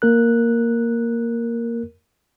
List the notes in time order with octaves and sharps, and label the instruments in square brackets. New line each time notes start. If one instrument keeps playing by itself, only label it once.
[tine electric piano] A#3 A#4 F#6